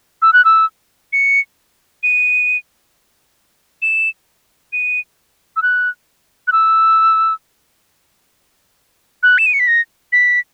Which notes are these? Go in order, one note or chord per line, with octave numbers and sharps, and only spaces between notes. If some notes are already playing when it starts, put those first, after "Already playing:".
E6
F#6
E6
C#7
D#7
E7
D#7
E6
F#6
F#6
E6
F#6
E7
D#7
C#7
B6
A#6
B6